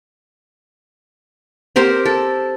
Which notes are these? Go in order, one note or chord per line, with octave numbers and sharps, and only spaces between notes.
C4 G4 A#4 C5
A4